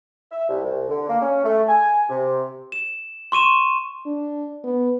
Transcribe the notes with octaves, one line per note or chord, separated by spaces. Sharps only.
E5
C2
C2
D3
A#3
C#4
A3
G#5
C3
E7
C6 C#6 D#7 E7
D4
B3